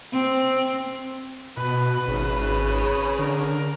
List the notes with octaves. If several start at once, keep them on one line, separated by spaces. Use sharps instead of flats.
C4
B2 B4
G#1 C#3
D3 A#4